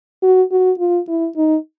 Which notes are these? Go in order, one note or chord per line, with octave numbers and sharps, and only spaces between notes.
F#4
F#4
F4
E4
D#4